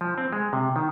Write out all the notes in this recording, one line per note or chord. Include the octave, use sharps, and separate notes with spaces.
F3
C4
G#3
C3
D#3